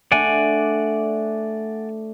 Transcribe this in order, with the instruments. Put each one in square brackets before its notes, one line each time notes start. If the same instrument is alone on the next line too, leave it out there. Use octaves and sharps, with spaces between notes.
[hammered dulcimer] A3 D4 [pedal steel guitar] D5 F#5 G#5